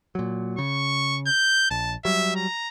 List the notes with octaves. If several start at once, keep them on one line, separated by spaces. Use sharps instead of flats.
A#2 F#3
C#3 C#6
G6
A#1 A5
F#3 G3 E5
A#5